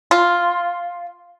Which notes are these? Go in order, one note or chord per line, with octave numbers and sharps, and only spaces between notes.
F4